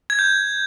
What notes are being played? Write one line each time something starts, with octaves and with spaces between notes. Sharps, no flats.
G#6
G6